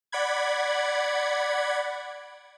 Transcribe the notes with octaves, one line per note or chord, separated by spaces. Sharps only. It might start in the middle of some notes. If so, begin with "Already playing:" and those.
D5 F#5 B5 G#6